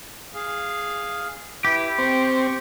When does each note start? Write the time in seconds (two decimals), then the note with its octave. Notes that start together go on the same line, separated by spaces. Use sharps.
0.34 G#4 F5
1.65 E4 G4 B4
1.98 C4 C#6